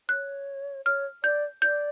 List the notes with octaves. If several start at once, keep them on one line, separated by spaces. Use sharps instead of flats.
C#5 F#6
C#5 F6
D5 G6
D5 G6